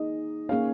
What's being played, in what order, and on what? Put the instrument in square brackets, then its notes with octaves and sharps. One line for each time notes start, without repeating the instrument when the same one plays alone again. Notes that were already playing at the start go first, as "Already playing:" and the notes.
Already playing: [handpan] A#3 D#4 G#4 [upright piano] D#5
[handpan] A#3 C#4 G#4 C#5 [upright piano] F5